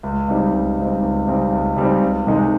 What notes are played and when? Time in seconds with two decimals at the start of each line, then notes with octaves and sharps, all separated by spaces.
0.03 C#2
0.28 C#3 G3 C4 D#4
0.53 C#2
0.78 C#3 G3 C4 D#4
1.02 C#2
1.27 C#3 G3 C4 D#4
1.52 C#2
1.76 C#3 G3 C4 D#4
2.02 C#2
2.27 C3 D#3 G#3 D#4